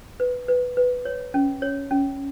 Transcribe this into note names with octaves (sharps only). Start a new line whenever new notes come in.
B4
B4
B4
C#5
C#4
C#5
C#4